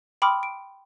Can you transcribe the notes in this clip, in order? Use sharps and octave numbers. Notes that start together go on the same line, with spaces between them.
G5 B5 C6 D6 D#6 F6
D7